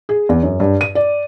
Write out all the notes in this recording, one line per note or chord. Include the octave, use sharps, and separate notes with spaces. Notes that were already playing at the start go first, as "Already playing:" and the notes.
G#4
E2
F#2
G2
D#7
D5